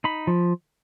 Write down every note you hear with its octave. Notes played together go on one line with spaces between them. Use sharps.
D#4 B5
F3